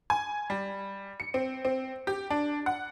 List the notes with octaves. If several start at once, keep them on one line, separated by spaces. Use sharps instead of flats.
G#5
G3
C#7
C4
C4
G4
D4
F#5